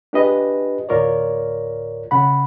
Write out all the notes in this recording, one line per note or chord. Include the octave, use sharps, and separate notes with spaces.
D4 F4 G4 G#4 B4 D#5
D2 A2 F4 A#4 C#5 D5
C#3 F#5 B5